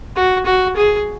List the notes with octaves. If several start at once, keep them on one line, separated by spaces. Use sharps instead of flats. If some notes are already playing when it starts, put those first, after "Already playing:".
F#4
F#4
G#4